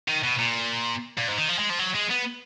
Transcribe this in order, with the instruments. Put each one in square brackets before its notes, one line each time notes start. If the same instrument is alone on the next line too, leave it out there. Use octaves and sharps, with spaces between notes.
[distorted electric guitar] D#3
B2
A#2
A#2
G#2
D#3
F3
G#3
F3
F#3
G#3
B3